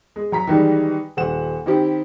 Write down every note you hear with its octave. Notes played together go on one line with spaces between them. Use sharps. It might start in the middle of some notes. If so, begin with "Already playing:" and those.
G#3
F#3 A#5 B6
D#3 E3 G3 G#3
D#1 F#5 E7
D#3 C4 E4 G4